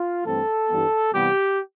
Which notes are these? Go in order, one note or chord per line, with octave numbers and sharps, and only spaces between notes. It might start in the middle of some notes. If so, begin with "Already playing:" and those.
Already playing: F4
G2 E3 A3 C4 A4
G2 E3 G3 B3
C3 E3 G3 B3 G4